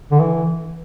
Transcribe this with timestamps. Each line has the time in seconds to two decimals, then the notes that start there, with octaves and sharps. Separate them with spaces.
0.11 D3
0.20 E3